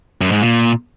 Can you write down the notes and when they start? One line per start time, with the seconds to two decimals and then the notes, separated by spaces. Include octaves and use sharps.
0.21 F#2
0.32 G#2
0.42 A#2